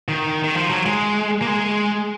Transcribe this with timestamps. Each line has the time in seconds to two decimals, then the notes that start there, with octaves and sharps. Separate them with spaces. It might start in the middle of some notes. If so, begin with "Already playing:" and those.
0.08 D#3
0.44 D#3
0.55 F3
0.70 F#3
0.86 G#3
1.42 A#3
1.47 G#3